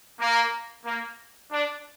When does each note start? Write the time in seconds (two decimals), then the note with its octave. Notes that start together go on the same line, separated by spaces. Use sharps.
0.20 A#3
0.86 A#3
1.52 D4